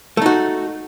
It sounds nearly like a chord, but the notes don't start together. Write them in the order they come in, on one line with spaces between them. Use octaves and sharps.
A3 D#4 F#4